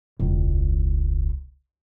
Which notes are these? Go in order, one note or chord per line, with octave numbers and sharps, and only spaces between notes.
E1 C#2